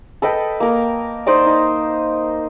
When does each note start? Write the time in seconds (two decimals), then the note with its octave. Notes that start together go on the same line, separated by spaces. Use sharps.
0.22 A4 B4 D#5 G5
0.60 A#3 A#4
1.26 D#4 C5 D5 D#5
1.46 D#4